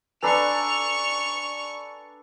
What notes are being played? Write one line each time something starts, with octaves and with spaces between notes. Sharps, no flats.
D4 A4 B4 G#5 A#5 C#6 F7